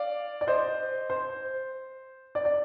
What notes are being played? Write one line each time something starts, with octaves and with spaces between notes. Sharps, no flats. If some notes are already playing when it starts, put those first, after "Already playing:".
Already playing: D5 F5
D5
C5 D#5
C5
D5
D5